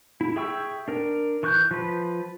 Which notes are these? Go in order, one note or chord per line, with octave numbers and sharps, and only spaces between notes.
E4
G#4 E5 G5 C#6 E6
D4 A#4
E3 C#6 F#6 G6
F3 B4